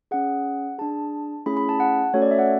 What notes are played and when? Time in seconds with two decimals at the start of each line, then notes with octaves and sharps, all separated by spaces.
0.11 C#4 G#4 F#5
0.78 D4 G#4 A5
1.46 A3 C#4 E4 G#4 B5
1.57 B5
1.69 A5
1.80 F#5
2.13 A3 C#4 F#4 A4 C#5
2.22 D5
2.31 E5
2.39 F#5